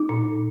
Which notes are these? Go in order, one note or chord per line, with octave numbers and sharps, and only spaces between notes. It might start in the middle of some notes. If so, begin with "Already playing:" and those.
Already playing: D#4
A#2